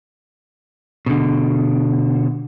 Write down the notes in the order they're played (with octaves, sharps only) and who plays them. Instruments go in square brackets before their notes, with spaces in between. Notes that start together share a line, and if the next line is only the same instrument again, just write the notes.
[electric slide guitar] B2 D3